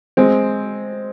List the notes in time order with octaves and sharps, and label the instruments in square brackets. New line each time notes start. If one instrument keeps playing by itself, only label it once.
[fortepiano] G#3 C4